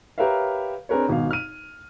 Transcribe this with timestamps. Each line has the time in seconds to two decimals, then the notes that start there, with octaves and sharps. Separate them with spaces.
0.18 G4 A#4 B4 C#5 E5 F5
0.89 C4 D4 G#4 A#4 B4 C#5
1.09 G#1 B2 F5
1.31 F6 D#7